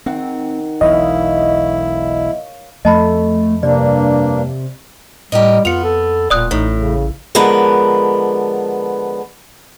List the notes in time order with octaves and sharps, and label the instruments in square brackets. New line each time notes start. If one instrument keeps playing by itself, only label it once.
[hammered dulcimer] D#3 F#5 [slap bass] C4
[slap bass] E1 B1 E2 [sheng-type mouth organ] E4 [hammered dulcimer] C#5 F5 [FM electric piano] D#5
[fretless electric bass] F2 [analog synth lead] A3 [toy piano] D#5 A5 B5
[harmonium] G2 A#3 D4 [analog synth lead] C3 [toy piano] D5
[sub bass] A2 [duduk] G3 [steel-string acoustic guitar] G4 A#4 D#5
[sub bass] F2 [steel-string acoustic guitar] B3 [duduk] F4 [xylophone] C#7 F7
[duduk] A4
[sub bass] D1 [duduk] A#2 [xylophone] D5 D#6 F#6
[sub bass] A1 [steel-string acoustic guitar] A2 [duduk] D#4
[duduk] C#3
[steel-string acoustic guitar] D3 F3 G#3 B3 A#4 B4